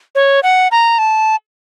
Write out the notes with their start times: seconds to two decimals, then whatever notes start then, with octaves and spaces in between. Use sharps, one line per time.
0.15 C#5
0.43 F#5
0.72 A#5
0.98 A5